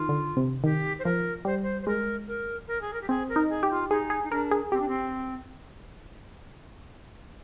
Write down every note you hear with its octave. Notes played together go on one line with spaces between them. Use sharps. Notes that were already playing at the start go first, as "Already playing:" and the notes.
Already playing: D#3 F4
D3
C3
D#3 G4
C5
F3 A#4
G3 C5
C5
C5
G#3 A#4
A#4
A#4
G#4
A#4
G4
C4 G#4
A#4
D#4
G#4
G4
F4
D#4 G#4
G#4
D#4
D4 A#4
G#4
C4 G4
D4
C4